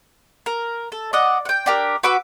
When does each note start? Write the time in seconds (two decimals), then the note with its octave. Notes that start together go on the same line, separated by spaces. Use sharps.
0.46 A#4
0.92 A4
1.13 D5 D#5 F#5
1.45 F#5 G5
1.66 D4 G4 A#4
2.03 F#4 B4 D6 E6